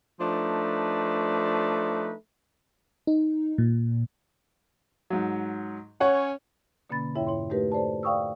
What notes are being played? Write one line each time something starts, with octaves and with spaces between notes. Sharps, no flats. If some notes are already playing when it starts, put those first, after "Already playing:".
F3 A3 D4 D#4 B4
D#4
A#2
G#2 F#3
C#4 C#5 F#5
B2 D3 A#3 C#4 B5 A6
F2 G#2 E4 C#5 E5 G5
E4 C#5 C6
A3 D#4 F#4 G4 A#4 B4
A4 C5 D5 A5
D5 F5 G5 C#6 D#6 E6